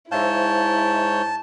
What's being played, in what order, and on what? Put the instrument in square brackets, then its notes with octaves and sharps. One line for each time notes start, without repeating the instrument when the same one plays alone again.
[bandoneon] G#2 C#5 G6 [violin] E4 [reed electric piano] C5 E5 F5 [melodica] A5